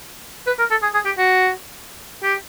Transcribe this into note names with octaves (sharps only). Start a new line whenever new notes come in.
B4
A#4
A4
G#4
G#4
G4
F#4
G4